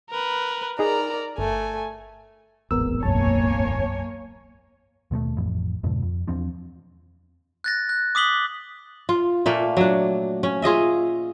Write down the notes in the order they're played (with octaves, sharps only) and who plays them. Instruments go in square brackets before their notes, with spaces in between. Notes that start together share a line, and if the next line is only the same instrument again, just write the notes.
[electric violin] A#4 B4
[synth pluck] D#4 G#4 [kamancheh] A#4 A#5 [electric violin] D5
[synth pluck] G1 [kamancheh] A3 [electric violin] G#5
[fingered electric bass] D1 G#1 E2 [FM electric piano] B3 A#4 E6
[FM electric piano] B1 F#2 A5 [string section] A#3 C#5 G#5
[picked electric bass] D#2 B2 G#3 A3
A1 F2
F2 G#2 B2 D3
F2
E2 F3 C4 D4
[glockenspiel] F#6 A6 A#6
F#6
D6 D#6 B6 F#7 G7
[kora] F4
A#2 A3 A#3
F#3 D4
C#4
F4 G#4 D#5 E5